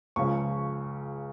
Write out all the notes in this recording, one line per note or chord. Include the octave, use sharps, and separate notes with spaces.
C#2 C#3 F3 C#6